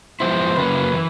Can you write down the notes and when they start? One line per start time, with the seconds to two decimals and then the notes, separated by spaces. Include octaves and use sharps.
0.20 F3 G#3 B3 E4 C5
0.57 F#2 C#3 F#3 A#3 C#4 B4
0.93 E3